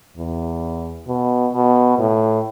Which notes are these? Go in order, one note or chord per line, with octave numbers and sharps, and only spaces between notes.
E2
B2
B2
A2